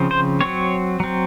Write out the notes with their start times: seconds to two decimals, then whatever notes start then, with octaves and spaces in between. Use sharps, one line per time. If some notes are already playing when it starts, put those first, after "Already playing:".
Already playing: C#3 F3 C4
0.11 C5
0.41 F#3 C4 C#5
1.00 F#3 C4